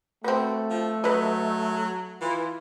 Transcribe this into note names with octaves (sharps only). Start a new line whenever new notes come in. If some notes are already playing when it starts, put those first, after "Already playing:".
A3 B3 C4 F#4
F3
F#3 B4 D#5
E3 F4